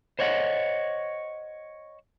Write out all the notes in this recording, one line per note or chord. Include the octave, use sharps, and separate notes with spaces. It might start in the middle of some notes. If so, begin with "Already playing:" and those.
C5 C#5 D#5 F#5